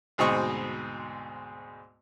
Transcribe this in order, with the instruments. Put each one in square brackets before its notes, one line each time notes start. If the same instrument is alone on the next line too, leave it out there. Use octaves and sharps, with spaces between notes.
[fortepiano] D2 G#2 B2 C4 D#5 C#6